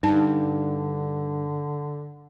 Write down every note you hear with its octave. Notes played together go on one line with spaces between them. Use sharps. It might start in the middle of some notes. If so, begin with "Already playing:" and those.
G2 D3 D#4 A5